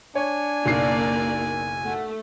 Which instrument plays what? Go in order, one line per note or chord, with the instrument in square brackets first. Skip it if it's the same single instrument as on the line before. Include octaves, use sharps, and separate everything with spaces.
[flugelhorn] D4 [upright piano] C#5 [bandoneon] G#5
[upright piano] F#1 B1 C7 [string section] A#3 D5
[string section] A3 [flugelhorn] F#5